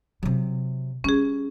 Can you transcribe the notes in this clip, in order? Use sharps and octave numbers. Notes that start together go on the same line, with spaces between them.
C3 F#3
G3 C#4 G#4